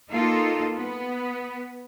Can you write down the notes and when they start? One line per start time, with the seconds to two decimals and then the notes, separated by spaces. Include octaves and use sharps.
0.10 A#3 D#4 F4 A4
0.76 B3